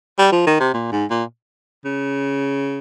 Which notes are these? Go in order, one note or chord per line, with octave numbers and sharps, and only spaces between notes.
G3
F3
D#3
C3
A#2
G#2
A#2
C#3